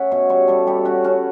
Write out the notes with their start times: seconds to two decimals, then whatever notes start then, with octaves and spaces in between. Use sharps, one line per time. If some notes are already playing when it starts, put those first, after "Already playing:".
Already playing: C#4 E5 F#5
0.11 B2 C#5
0.30 G3 C#5
0.48 G3 A4
0.67 G3 G4
0.85 C#4 F#4
1.04 C#4 F#4